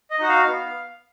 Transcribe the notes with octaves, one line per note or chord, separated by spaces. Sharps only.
D#5
D#4 F#4 F#5
F5
B3